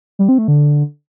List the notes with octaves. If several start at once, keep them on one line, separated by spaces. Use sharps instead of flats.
G3
C4
A3
D3